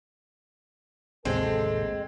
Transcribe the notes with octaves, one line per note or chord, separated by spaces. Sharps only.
A1 D#2 C3 G#3 C4 A4